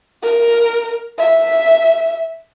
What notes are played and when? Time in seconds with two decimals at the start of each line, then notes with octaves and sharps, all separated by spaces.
0.23 A#4
1.18 E5